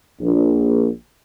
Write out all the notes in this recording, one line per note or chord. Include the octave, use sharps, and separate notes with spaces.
A#1